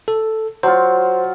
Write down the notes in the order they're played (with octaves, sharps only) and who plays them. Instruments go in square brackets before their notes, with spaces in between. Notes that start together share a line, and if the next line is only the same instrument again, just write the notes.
[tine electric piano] A4
[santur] F#3 F4 [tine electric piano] C5